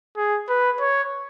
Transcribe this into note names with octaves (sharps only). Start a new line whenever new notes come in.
G#4
B4
C#5